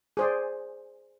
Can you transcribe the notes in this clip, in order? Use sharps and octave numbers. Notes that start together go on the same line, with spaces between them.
G#4 C5 D5